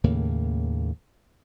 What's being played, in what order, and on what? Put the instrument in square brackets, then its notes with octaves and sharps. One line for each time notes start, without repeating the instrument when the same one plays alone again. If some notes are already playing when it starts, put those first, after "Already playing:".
[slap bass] D#2 A2 C#3 A#3